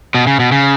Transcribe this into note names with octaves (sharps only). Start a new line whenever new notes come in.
B2
C#3
B2
C#3